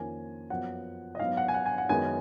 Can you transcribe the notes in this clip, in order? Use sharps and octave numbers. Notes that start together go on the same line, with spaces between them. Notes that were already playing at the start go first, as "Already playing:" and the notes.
Already playing: F2 D#3 A#3 C#4 G#5
F#2 F3 B3 F#5
D#5
G#2 F#3 B3 F5
F#5
G#5
F#5
G#5
F#5
F#2 D#3 G#3 B3 G#5